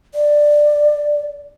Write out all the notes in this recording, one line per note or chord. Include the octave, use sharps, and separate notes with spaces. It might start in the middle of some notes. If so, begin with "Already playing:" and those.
D5